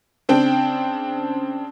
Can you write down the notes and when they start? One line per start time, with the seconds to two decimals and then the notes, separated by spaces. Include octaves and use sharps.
0.29 C#3 C4 D4 G5